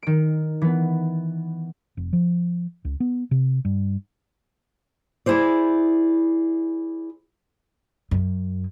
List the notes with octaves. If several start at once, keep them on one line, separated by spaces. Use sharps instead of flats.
D#3 D7
E3 B3
F1
F3
C#2
B3
C3
G2
E4 G#4 C5 D5
F#2